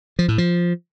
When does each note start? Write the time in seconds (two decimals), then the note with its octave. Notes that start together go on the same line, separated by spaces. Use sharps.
0.19 F3
0.28 A2
0.38 F3